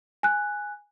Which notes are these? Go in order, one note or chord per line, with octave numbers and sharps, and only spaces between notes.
G#5 F#6